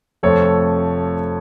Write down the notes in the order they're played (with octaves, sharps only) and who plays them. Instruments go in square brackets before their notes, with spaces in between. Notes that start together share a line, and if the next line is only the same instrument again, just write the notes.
[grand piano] F1 F2 F3 A3 A4 C#5